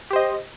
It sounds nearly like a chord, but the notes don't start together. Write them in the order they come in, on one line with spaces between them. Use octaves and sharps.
G4 C5 D#5